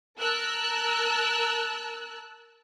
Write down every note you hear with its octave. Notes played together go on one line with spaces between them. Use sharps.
A#4 A5 E6 F#6